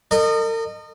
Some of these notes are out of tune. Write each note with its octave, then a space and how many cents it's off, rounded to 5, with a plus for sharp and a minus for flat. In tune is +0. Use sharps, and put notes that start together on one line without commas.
A#4 -45 D#5 -25